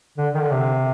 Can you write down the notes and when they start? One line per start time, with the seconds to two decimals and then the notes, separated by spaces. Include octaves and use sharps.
0.18 D3
0.34 D#3
0.43 D3
0.52 C3